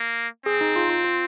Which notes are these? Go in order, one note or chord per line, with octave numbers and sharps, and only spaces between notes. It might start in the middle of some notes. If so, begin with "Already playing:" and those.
Already playing: A#3
C4 G#4
D#4
F4
F4
F4